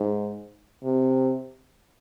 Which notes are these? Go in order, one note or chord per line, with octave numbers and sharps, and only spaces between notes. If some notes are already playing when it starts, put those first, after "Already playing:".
Already playing: G#2
C3